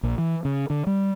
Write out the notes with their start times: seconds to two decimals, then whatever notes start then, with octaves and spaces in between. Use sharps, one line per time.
0.03 A#1
0.18 E3
0.45 C#3
0.70 D3
0.87 G3